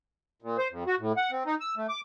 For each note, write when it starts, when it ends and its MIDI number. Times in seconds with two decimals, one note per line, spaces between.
0.42 0.57 46
0.58 0.68 72
0.71 0.84 41
0.87 0.95 66
0.99 1.12 45
1.17 1.31 78
1.31 1.43 60
1.46 1.55 63
1.60 1.75 88
1.77 1.87 57
1.89 2.01 86